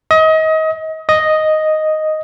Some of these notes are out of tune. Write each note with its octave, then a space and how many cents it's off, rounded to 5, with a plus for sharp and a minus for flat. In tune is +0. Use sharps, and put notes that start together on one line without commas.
D#5 +30
D#5 +0